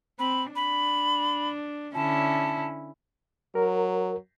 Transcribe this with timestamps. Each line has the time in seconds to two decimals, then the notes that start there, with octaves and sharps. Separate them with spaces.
0.19 C4 B5
0.56 D4 B5
1.94 D3 C#4 E4 A5
3.55 F#3 A#4